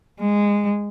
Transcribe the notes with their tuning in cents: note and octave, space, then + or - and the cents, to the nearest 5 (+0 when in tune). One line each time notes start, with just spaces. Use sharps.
G#3 -15